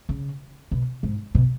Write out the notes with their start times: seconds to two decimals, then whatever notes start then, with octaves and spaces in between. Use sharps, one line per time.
0.09 C#3
0.71 B2
1.03 G#2
1.35 B2